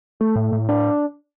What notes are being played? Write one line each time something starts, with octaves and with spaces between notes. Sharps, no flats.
A3
A2
A2
D4